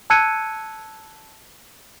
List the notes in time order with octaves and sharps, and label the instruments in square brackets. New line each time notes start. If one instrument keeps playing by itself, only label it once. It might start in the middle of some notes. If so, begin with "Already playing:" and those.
[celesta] A5 E6 F#6 G#6 C#7 D#7